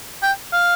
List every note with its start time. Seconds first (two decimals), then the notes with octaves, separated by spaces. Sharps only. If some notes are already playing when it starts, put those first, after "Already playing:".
0.23 G5
0.53 F5